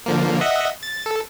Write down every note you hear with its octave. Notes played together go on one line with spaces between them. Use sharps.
D3 F3 A#3
D#5 E5 F#5
A6
A4